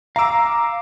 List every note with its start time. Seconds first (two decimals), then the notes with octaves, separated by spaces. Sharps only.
0.16 F5 A#5 D6 E6